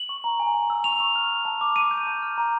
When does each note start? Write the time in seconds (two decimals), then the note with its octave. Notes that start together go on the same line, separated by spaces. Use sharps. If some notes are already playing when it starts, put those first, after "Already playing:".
Already playing: F#7
0.09 C#6
0.24 A#5
0.40 G#5
0.54 G#5
0.70 E6
0.84 C#6 F7
1.00 C#6
1.15 F6
1.31 F6
1.45 A5
1.61 D6
1.76 A5 D#7
1.91 G6
2.07 A5
2.22 F6
2.38 A#5